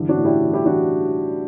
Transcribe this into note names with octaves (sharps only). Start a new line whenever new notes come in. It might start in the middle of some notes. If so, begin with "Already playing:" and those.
Already playing: G2 D3 E3
D4 F#4
A2
E4 G4
E3
E4 G4
E3 D4 F#4